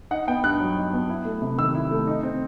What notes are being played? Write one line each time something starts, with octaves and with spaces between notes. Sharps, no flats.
D#4 F#5
B3 G5
G2 F#6
F#3
D#4
B3
E4
A3
C3
D#3 E6
E4
A3
D#4
C4